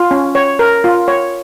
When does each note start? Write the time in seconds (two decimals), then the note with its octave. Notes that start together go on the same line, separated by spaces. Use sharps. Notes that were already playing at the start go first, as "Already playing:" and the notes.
Already playing: F4
0.11 C#4
0.35 C#5
0.59 A#4
0.84 F4
1.08 C#5